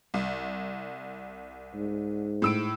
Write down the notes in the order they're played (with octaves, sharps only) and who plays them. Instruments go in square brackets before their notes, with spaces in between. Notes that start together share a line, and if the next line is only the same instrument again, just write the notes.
[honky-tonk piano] C2
[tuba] G#2
[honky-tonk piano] A2 E6 D7